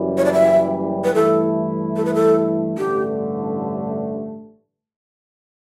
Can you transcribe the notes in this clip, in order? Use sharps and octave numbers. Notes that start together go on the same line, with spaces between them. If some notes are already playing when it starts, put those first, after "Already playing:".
Already playing: F#1 F#2 E3 G3
C#5
D5
E5
B4
G2 E3 A3 E4 A4
A4
B4
A4
A1 G2 D3 A3 G4